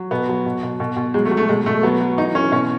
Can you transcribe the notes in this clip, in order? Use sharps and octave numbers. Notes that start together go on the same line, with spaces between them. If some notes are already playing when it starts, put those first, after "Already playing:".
Already playing: F#3
B2 B3
F#3
B2
B2
B2
B2
F#3 G#3
A3
F#3
A3
B2 G#3
B2 A3
F#3 B3
F#3
E3 D#4
E3 C#4
B2 C#4